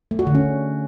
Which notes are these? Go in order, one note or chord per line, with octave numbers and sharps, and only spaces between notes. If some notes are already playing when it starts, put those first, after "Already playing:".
A3
F#4
D3
C#4